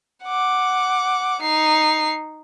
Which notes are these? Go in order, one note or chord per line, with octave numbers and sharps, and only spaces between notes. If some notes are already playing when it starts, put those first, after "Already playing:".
F#5 D6
D#4 C7